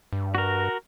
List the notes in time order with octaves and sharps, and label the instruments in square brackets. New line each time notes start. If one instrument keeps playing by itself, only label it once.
[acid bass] G2
[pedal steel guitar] F#4 A#4